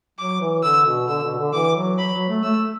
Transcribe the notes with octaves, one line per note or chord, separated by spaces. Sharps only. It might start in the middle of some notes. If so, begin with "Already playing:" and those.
F#3 D6
E3
D3 E6
B2
D3 E6
B2
D3
E3 D6
F#3
F#3 B5
F#3
A3
A3 E6